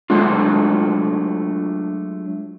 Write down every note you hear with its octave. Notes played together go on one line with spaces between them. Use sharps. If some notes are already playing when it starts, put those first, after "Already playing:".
F#3 G#3 A3 D4 F4